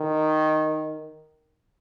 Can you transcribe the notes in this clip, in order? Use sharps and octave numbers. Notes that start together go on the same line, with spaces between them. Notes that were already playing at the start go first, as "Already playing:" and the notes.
Already playing: D#3